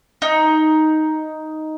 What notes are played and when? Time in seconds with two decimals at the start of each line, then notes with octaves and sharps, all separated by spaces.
0.22 D#4